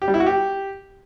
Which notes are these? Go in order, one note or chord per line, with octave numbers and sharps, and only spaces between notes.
G4
G3
E4
F#4
G4